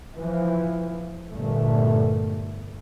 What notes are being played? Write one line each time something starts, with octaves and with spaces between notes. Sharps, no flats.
E3 F3
G1 A#2 A3